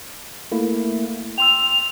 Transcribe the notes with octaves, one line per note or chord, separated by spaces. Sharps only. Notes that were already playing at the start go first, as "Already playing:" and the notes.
A3 A#3 E4
G5 C6 E6 F7